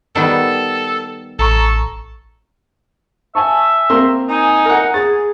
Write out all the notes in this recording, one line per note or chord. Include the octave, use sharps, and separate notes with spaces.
D#3 G3 B3 A4
A1 A4 A#5 C#6
E5 G#5 A5 C#6
A#3 C4 A#4 C6
D#4 G#5
A#4 F#5
G#4 A6